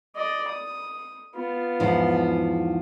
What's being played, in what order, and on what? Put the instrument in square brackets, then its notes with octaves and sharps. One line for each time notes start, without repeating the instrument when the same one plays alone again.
[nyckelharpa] D5 D#5
D#6
B3 F4
[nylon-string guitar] E2 G#2 F3